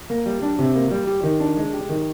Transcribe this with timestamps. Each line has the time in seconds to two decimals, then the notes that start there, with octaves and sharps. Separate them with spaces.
0.10 A#3
0.26 G3
0.42 D4
0.59 C3
0.75 A#3
0.91 G3
1.07 G4
1.24 D#3
1.40 D4
1.57 G#3
1.73 G4
1.89 D#3